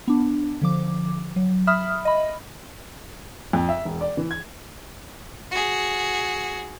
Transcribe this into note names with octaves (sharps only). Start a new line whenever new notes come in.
B3 D4
D3 F3 D6
F#3
E5 B5 D#6 F6
D#5 B5
F2
E5
E1
D5
E3
G#6
F#4 G#4